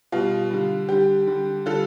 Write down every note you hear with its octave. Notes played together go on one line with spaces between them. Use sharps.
B2 G3 F4
D3 G3
D3 G3 G4
D3 G3
D3 G3 F4 A4